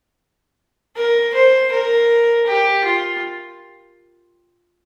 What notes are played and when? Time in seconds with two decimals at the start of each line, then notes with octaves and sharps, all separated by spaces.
0.97 A#4
1.34 C5
1.72 A#4
2.47 G4
2.85 F4